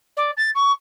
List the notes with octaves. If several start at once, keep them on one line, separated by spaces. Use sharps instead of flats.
D5
A6
C#6